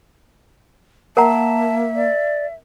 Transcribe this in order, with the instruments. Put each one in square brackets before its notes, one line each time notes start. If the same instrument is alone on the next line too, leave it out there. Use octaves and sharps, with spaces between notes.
[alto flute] A#3 [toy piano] A#4 F#5 A#5 [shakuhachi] E5 [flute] A5
[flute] D5